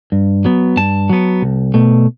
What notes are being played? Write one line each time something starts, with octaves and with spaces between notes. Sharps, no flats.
G2
F#3 B3
G2 A5
F#3 B3
C2
B2 A3